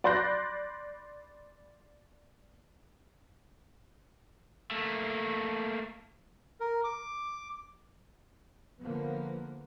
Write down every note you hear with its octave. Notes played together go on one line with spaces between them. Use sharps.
D5 B5 C6 F#6 G6 A#6
A3 A#3
A#4
D6
D3 F3 A#3 B3